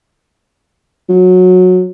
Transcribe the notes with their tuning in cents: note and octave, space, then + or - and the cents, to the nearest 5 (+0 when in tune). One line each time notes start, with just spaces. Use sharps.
F#3 -15